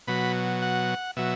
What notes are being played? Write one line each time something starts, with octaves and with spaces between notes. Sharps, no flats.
B2 F#3 B5
F#5
B2 F#3 E5